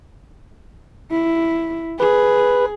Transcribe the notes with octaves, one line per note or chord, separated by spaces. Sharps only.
E4
G#4 B4